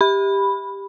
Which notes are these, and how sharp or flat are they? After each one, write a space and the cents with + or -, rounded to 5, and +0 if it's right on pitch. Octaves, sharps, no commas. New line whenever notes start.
G4 +10 B5 +0